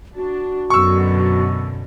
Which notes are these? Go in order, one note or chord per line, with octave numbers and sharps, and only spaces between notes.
D4 F#4
F#2 B2 D3 C#6 E6